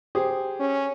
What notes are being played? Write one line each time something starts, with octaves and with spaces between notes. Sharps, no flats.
G4 G#4 C5
C#4